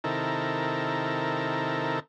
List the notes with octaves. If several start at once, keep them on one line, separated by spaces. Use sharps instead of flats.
C3 D#3 E4 A4 A#4